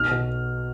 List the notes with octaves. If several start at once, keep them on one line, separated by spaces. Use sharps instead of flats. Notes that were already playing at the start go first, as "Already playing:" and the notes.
Already playing: B1 F6
B2